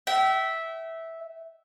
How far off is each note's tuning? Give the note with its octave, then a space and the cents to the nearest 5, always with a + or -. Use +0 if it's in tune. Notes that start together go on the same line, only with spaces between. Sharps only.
E5 -10 G5 -40